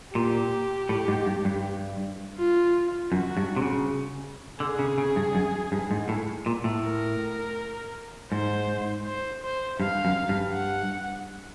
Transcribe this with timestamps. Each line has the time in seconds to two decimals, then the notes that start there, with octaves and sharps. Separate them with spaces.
0.15 A#2 G4
0.89 A2
1.08 G#2
1.26 G2
1.45 G2
2.38 F4
3.12 F#2 F#4
3.37 G2
3.56 C3
3.62 C#3
4.60 D3 G#4
4.79 C#3
4.98 C#3
5.16 G2
5.35 F#2
5.72 G2
5.91 G#2
6.09 A2
6.46 A#2
6.64 A2
6.84 A#4
8.32 G#2 C5
9.06 C5
9.43 C5
9.80 G2 F5
10.05 F#2
10.29 G2
10.54 F#5